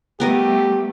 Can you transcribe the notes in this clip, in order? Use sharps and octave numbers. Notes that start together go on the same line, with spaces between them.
G3 A3 B3 G4 A#4 D#5